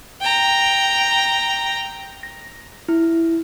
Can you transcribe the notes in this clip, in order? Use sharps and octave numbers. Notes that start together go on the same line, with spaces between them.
G5 A#5
A#6
E4